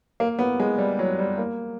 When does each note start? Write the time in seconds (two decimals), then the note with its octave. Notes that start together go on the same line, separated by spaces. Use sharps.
0.20 A#3
0.39 B3
0.60 G#3
0.78 G3
0.99 F#3
1.19 G3
1.38 A#3